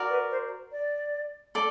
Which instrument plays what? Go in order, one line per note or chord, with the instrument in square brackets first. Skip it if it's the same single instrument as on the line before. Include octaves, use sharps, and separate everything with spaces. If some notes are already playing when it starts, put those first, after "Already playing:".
Already playing: [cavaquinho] F#4 A#4 D5
[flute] B4
C5
D5
[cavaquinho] A4 D5